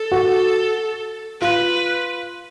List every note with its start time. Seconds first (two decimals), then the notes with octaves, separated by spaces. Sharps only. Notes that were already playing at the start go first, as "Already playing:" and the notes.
Already playing: A4
0.11 F#4
1.41 F4 B4